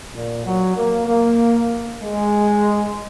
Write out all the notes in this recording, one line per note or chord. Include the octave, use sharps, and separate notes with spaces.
A#2
F#3
A#3
A#3
G#3